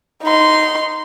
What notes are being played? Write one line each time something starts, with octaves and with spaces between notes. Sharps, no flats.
D#4 C6